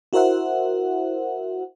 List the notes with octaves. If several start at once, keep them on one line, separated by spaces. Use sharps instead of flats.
E4 F#4 A#4 C5 E5 F#5